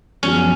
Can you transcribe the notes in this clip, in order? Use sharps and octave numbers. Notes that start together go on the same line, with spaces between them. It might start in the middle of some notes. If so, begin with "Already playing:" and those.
F#2 F3 B3 C#4 F#4